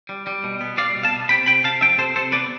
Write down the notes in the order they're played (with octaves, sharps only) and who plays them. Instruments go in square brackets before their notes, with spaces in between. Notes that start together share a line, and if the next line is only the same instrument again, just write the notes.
[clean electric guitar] G3
G3
B2
B3
G3 D5 F5
B2
F5 A5
B3
C3 G5 B5
C3 G5 B5
C3 F5 A5
F3 E5 G5
C3 A4 C5
C3 A4 C5
B3 B4 D5